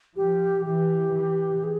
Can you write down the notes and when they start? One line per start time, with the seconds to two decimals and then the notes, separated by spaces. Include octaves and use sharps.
0.16 F3 G4
0.65 E3 G4
1.14 E3
1.64 G#4